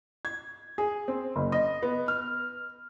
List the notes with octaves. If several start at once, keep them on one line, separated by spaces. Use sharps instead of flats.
G#6
G#4
C4
F#1
D#5
B3
F6